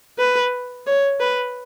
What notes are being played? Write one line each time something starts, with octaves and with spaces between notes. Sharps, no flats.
B4
C#5
B4